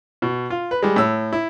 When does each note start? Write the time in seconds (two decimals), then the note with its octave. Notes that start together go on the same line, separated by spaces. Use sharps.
0.22 B2
0.50 F4
0.71 B4
0.82 G3 G#3
0.96 A2 E6
1.33 E4